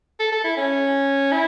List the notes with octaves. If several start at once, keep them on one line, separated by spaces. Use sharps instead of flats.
A4
A4
E4
C#4
E4